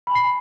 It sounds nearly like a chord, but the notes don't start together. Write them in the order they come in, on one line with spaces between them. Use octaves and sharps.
B5 G#5 C7